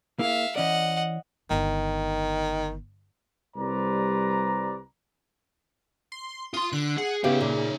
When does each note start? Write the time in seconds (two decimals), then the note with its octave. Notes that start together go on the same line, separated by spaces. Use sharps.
0.19 A#3 E4 G#4 E5 F5
0.56 E3 C#4 D5 D#5 F#5
1.51 G1 D#3
3.57 C2 G3 B4 C5 D5 A#5
6.12 C6
6.54 F4 C6 D#6
6.73 D3 F#6
6.98 G#4 F#5
7.24 C#3 B3 D#4 G4 E5 F5
7.41 A#2